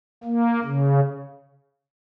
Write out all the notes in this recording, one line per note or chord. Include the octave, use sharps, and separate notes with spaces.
A#3
C#3